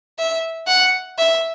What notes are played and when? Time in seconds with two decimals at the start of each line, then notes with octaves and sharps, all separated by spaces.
0.19 E5
0.68 F#5
1.18 E5